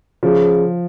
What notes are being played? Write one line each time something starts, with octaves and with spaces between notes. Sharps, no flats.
C#3 F3